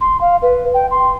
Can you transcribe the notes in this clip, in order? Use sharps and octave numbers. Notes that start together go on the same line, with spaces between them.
C6
F5
B4
G5
C6